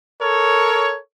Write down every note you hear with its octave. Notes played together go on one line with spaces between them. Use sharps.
A4 A#4 C#5